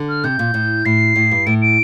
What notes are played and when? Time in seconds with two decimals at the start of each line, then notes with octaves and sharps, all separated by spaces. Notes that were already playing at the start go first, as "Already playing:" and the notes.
Already playing: D3
0.09 F6
0.24 C3 G6
0.39 A#2
0.54 A2
0.85 A2 C7
1.16 A2
1.31 G2
1.46 A2 D7
1.61 D7